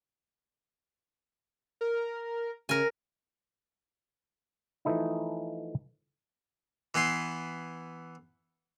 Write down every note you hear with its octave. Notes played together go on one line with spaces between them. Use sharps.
A#4
C#3 A#4 G#5
E3 F3 A3 D#4 E4
E3 B3 E4 C6